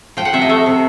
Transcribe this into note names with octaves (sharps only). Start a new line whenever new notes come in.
F3 G5
F#5
C3 E5
D#5
A3 E5
C3